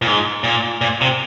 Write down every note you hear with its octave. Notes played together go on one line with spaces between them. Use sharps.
A#2
G#2
A#2
A#2
C3